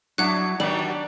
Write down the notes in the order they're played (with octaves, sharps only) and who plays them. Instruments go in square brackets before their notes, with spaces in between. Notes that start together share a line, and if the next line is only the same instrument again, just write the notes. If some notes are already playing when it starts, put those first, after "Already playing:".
[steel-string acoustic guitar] F#3 [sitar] D4 E4 [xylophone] F#5 F#6
[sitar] D#3 F#3 G3 [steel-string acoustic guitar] D4 [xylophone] F#7